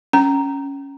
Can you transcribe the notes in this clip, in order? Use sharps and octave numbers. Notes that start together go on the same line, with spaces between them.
C#4 A#5